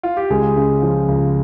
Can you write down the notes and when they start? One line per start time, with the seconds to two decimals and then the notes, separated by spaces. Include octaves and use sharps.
0.03 F4
0.17 G4
0.30 C#2 G#3 G#4
0.56 C#3
0.82 F3
1.08 C#2